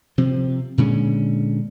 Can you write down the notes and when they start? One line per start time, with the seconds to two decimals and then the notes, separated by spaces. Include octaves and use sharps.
0.18 C3 F3 C4
0.78 A#2 D3 G#3 C#4